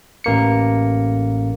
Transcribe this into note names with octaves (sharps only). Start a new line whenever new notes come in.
A1 A#3 C#7